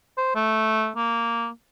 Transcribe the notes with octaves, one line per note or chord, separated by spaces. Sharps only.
C5
A3
A#3